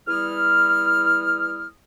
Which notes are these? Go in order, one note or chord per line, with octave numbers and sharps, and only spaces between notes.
E2 E3 G3 E4 D#6 F6